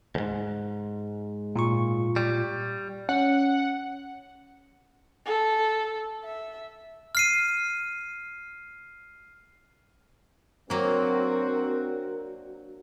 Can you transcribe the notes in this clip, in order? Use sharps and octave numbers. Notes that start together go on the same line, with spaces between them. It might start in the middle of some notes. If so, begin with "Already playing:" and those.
D2 G#2
A#2 F4 C#6
G3
C#4 F#5
A4
E5
F6 C7 D#7
F#3 A#3 C4 D4 F#4 A#4